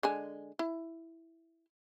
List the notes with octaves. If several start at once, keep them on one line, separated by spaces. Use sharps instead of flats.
D3 G#3 G#5
E4